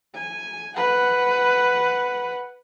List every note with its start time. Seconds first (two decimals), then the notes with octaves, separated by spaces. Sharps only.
0.15 G#5
0.76 B4 F#5